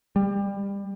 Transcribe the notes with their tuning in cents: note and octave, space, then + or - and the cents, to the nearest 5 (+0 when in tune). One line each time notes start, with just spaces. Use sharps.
G3 +25